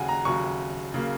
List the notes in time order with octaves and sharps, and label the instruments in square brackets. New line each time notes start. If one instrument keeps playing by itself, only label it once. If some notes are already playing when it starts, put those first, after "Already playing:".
Already playing: [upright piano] D#2 C#3 F#3 F#5 G#5
A#5
D#2 C#3 F#3 C#6
C#3 F#3 A#3